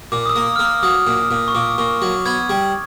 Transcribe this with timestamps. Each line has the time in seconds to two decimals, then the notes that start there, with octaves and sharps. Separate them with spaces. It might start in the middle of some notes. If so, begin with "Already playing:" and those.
0.12 A#2 D6
0.26 D#6
0.29 E6
0.36 A#3
0.56 A#3 F6
0.65 E6
0.83 F#3 D#6
1.07 A#2
1.31 A#2
1.48 C#6
1.55 A#2 D6
1.78 A#2 C#6
2.02 F#3
2.26 B3 G#6
2.49 G3